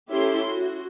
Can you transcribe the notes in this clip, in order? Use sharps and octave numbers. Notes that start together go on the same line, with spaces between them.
C#4 E4 G4 A4 C6
F#4